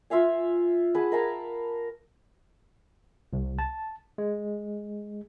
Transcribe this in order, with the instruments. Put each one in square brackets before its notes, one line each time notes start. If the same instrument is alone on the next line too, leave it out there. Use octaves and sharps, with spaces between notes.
[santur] F4 E5 F5 G#5
G#4 B4 F#5 A5
A#4 F5 A5 B5
[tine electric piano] C2
A5
G#3